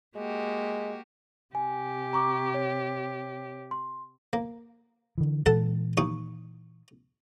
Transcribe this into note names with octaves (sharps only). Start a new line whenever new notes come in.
G#3 A#3 F#4 G4
C3 G4 G#5
A#5 C#6 D6
C#5
C6
A#3
D3 E3
A#2 E3 G#3 A4 F#5 A5
D#2 C#6 D#6